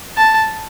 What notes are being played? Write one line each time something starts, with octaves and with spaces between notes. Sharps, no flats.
A5